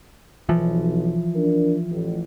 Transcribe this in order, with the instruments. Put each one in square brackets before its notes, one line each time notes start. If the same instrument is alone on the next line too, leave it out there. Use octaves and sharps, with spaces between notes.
[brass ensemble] B1 [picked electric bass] E3 F3
[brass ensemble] D4 A#4
A1